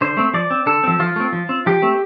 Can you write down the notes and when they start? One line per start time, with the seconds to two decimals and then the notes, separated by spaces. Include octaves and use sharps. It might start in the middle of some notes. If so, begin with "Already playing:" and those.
0.01 D3 C5
0.17 A3 C4
0.34 F3 D5
0.51 C4
0.66 D3 A4
0.84 F3 C4
0.99 F3 F4
1.16 A3 C4
1.32 F3
1.49 C4
1.66 F3 G4
1.82 A3 C4